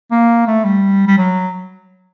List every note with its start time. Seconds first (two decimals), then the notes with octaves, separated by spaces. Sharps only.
0.11 A#3
0.47 A3
0.65 G3
1.07 G3
1.18 F#3